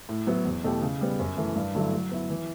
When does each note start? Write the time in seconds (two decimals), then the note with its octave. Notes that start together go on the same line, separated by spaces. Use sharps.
0.09 A2
0.27 F#3 B3 E4
0.45 E2
0.64 B2 A3 E4 G4
0.82 C#3
1.01 G3 B3
1.19 F#2
1.37 E3 A3
1.55 G2
1.75 D3 F#3 A3 E4
1.93 F#3
2.11 B3 E4
2.30 E3